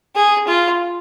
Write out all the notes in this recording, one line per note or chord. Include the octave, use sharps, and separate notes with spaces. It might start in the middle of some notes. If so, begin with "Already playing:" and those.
G#4
F4